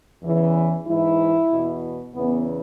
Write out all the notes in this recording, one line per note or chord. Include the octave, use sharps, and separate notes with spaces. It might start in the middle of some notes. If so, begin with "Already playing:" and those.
E2 C#3 E3
G#2 E3 E4
E2 B2
E2 C#3 E3 B3